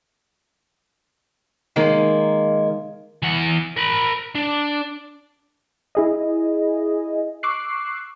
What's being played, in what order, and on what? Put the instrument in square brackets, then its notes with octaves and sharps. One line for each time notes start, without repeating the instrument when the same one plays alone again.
[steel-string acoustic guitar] D#3 G#3 A#3
[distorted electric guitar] E3 F#5
A#4 B5
D4
[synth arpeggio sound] E4 G#4 D#5
C#6 D6 E6 F#6 C7